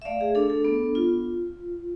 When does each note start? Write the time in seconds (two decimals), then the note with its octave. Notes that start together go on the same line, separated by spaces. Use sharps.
0.02 E5
0.05 A3 D5 F5
0.21 G#4
0.35 D4 A4
0.50 A4
0.64 B3
0.95 F4